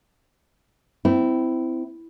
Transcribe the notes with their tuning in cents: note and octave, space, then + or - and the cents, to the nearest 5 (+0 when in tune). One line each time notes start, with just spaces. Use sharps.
C4 -20 E4 +0